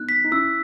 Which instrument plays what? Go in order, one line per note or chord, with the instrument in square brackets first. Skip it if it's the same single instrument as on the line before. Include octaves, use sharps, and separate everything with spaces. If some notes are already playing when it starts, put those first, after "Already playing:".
Already playing: [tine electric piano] B3 D#4 [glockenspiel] F#6
[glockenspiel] B6
[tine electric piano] D#4
[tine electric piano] C#4 E4 [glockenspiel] E6